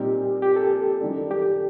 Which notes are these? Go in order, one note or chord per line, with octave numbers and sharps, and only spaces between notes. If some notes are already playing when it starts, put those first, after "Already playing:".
Already playing: A#2 G3 C4 D#4 G4
G4
A4
F#2 D#3 G3 D4
G4